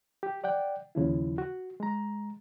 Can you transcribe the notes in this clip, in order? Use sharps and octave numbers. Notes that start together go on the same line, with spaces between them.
G4
D5 F#5 G5
D#2 C#3 F3 E4
F#4
G#3 A#5